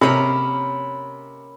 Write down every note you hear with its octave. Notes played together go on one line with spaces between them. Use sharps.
C3 A#3 C#4 A#4 B5